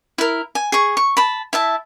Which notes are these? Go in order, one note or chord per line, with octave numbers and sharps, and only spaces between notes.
E4 A#4
G#5
G#4 C#6
C#6
A5 B5
E4 E5 A5